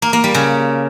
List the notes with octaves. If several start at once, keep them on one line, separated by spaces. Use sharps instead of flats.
A#3
A#3
G3
C#3